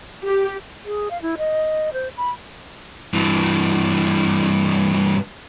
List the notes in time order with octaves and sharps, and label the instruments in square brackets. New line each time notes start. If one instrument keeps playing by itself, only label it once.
[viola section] G4
[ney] G#4
F5
E4
D#5
C5
B5
[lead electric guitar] G2 E3